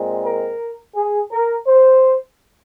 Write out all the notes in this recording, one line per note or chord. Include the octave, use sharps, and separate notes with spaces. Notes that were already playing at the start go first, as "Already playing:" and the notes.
Already playing: A#2 G#3 C4
A#4
G#4
A#4
C5